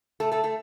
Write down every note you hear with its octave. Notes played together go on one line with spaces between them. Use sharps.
A3 A4
A3 A4
A3 A4